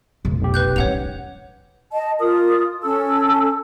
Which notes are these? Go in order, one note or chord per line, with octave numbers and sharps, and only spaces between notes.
F1 B1
B1 G4
B4 F#6 G6
A1 C#4 C#5 F#5 F7
D#5 A5
F4 A#4 D#6
C#4 A4 A5 E6